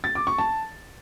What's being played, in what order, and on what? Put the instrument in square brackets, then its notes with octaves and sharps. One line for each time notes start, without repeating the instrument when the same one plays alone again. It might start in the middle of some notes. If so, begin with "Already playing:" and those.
[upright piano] A6
D6
C#6
A5